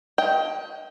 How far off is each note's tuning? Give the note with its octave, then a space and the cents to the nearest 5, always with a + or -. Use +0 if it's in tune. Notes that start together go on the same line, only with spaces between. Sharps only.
D#5 +35 G5 +0